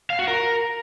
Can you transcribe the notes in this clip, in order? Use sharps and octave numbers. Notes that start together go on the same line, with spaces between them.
F5
F#4
A#4